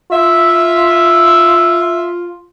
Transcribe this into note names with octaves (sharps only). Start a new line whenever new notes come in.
F4 E5